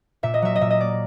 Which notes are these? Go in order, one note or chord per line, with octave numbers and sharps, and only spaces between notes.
A#2 E5
D#5
F#3 E5
D#5
A#2 E5
D#5
A#3 D5